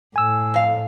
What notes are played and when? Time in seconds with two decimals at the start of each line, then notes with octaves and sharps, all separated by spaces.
0.16 A2 G#5 E6
0.54 F2 F5